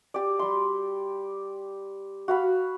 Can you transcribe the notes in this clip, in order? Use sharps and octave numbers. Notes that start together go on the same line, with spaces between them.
G4 D5
G3 C6
F#4 F5 B5